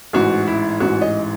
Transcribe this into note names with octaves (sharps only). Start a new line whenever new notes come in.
A1 G#2 E3 F#4
E4
A1 G#2 E3 F#4
D#5